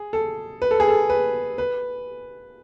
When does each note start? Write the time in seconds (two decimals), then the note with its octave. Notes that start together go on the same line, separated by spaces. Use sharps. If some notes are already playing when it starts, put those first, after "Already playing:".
Already playing: G#4
0.13 A4
0.62 B4
0.71 A4
0.80 G#4
0.88 A4
1.10 B4
1.58 B4